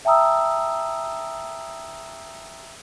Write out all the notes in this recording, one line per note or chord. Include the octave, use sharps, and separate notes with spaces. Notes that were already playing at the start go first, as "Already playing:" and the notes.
E5 G5 A5 A#5 D#6 E6